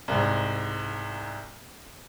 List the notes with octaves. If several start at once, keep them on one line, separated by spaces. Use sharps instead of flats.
C2 G#2